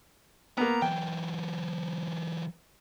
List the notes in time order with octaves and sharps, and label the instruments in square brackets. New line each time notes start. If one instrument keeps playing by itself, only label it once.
[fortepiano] A#3 B3 [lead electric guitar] A#5
[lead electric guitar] E3 F#3 [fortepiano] G5